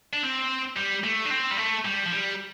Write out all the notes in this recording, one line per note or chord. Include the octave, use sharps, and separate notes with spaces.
D4
C4
G3
A3
D4
C4
G3
A3
G3
F3
G3